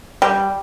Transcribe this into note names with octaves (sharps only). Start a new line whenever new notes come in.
G3